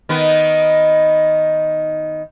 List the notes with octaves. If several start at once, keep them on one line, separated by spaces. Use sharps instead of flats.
D#3 B3